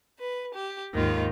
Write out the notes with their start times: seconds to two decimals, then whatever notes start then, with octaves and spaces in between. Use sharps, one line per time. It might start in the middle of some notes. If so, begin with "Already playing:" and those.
0.17 B4
0.53 G4
0.94 D#2 G#2 D#3 F4